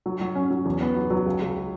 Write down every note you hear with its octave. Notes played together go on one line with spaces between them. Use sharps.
F#3
F#3
C#4
F#3
E2
B3
F#3
F#3
C#2
C#2